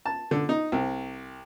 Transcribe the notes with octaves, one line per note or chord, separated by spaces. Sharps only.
A5
D3
D#4
C2